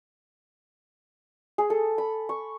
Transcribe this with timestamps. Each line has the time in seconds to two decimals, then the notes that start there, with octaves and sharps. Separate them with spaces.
1.58 G#4
1.70 A4
1.98 B5
2.29 C#6